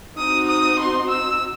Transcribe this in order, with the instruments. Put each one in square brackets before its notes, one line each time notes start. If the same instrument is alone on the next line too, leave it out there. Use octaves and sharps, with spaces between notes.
[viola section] C4 D#4 F#4 [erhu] D#6
[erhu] D#6
C6
E6